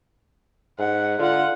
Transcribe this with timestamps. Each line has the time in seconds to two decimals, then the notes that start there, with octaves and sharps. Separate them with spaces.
0.79 G#2 F#5
1.19 D3 F4 F#5